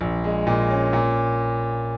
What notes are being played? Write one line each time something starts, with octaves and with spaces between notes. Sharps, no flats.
A#1
G#3
A#2
C#4
A#2